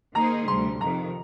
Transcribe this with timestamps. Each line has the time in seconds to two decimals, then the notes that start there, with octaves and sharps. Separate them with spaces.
0.15 D#3 A#3 D#4 G#4 C5 A#5
0.47 D2 C3 G3 C6
0.81 F2 C3 D#3 A#5